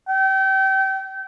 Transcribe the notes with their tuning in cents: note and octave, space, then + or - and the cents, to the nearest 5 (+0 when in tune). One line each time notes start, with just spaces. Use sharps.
G5 -30